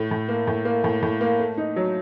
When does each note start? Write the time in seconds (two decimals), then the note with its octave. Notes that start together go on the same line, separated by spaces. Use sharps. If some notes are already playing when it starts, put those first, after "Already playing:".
Already playing: A2
0.11 A2
0.29 A#3
0.47 A2
0.65 A#3
0.84 A2
1.03 A2
1.21 A#3
1.39 A3
1.58 D#4
1.76 F#3